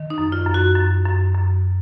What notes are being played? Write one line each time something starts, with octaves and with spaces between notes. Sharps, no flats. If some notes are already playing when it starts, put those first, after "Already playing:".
Already playing: D#3
D#4
F#2
F4
F#2
F#4
F#2
F#2
F#2